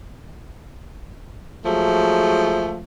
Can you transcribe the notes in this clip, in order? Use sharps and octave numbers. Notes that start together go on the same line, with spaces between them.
F3 F#3 G#3 A3